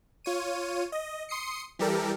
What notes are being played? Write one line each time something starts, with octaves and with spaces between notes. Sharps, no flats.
F4 C#5 D#7
D#5
C6 D#6 C7 C#7
E3 G3 G4 A4 A#4